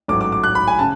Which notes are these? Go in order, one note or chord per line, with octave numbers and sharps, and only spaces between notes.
A1 G#2 F#3 A3 D6
D6
D6
F#6
B5
G#5
C#3 A5